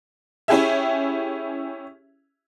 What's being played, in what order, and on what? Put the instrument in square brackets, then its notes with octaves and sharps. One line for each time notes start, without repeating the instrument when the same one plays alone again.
[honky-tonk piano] C#4 E4 G4 G#4 E5